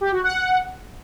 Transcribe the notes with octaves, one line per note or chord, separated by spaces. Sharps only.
G4
F#4
F#5